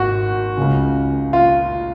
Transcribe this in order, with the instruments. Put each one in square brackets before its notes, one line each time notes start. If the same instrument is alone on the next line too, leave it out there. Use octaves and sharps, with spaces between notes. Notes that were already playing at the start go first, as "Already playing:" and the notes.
Already playing: [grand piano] G#1 F#4
C#2 C#3
F4